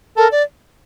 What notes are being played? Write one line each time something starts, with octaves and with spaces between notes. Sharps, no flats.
A4 A#4
D5